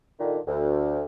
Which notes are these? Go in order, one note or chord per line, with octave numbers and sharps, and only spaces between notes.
A#2 D3 D#3
D2